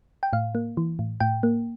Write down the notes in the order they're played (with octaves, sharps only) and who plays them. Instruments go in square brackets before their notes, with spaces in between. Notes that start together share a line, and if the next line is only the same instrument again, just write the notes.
[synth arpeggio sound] G5
A2 F5
A#3
E3
A2
A2 G5
A#3